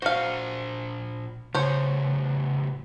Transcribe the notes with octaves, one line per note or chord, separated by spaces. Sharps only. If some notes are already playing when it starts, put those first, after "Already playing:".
A#2 F#4 C5 F5
A2 C#3 C5 C#5